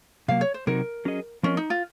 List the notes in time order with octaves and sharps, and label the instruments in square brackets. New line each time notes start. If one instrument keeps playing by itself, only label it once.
[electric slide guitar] C3 F#3 A#3 [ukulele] F5
[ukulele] C#5
C5
[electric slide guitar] C3 F#3 C4 D#4 F#4 [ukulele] A#4
[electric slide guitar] F#3 C#4 G#4 D#5
[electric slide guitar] F3 C4 F4 A#4 D#5 [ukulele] C#4
[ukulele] D#4
F4